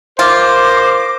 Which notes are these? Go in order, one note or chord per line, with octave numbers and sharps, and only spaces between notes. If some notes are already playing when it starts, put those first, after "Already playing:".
F4 A#4 C5 D6